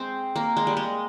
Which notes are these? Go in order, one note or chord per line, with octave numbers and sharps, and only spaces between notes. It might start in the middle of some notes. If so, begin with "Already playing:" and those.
Already playing: G#3 C4
A#3
G#3
G3
G#3